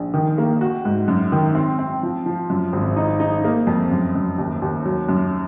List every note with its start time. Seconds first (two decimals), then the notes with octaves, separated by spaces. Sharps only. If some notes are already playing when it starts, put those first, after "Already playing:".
Already playing: A#1
0.14 D#3
0.38 A#3
0.61 F#4
0.85 G#2
1.08 F#2
1.32 D#3
1.55 C4
1.79 C4
2.03 F3
2.26 F3
2.50 F#2
2.73 G#1
2.96 D#4
3.20 D#4
3.45 A#3
3.67 F2
3.91 F#2
4.15 F#2
4.38 D#2
4.62 D#2
4.85 F#3
5.09 F#2